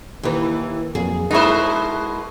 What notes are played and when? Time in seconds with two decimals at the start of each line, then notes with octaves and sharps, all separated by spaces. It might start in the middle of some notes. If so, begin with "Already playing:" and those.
0.23 D#2 D#3 E3 G4 A#4
0.95 F2 F#3 A#3 G#4
1.31 B2 G#3 D#4 E4 A#4 C5 C#6